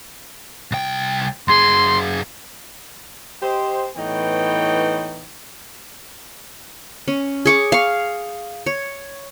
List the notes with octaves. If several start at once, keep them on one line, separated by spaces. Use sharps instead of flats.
C2 G5
F#2 G#4 C6
G4 C5 D#5
A2 E3 B3 D#4 C#5 G5
C#4
G#4 C#6 D6
F5 C#6
C#5